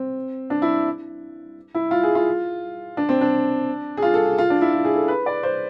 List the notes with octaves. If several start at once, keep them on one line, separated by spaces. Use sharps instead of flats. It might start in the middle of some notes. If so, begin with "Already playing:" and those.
Already playing: C4
D4
E4
E4
F4
G#4
F4
D4
C4
D4
G#4
F4
A4
G#4
F4
D4
E4
F4
G#4
A4
B4
D5
C5